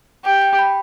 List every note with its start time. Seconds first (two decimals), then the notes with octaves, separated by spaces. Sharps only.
0.25 G4 G5
0.42 G5
0.59 B5